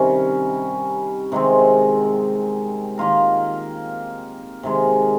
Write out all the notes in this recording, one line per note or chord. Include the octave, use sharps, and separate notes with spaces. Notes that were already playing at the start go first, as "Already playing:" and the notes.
Already playing: C3 D#3 G3 C#4
C3 D#3 G#3 C4
D#3 A#3 F4 A#4
C3 D#3 G#3